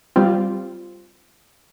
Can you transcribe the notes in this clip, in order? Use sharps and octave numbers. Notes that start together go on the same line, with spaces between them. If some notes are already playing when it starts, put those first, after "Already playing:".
G3 C4 F4